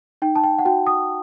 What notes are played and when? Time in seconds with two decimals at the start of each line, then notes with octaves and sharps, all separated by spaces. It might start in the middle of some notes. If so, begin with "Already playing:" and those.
0.22 D#4 G5
0.36 A5
0.44 G5
0.58 F#5
0.65 F#4 G5
0.86 D#6